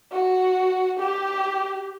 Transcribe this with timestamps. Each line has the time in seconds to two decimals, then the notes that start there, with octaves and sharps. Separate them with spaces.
0.12 F#4
0.99 G4